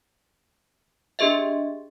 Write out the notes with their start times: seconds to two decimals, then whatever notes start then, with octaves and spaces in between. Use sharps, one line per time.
1.19 D4 G4 G#4 D#5 E5